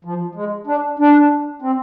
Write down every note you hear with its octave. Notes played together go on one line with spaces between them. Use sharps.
F3
G#3
D4
D4
C4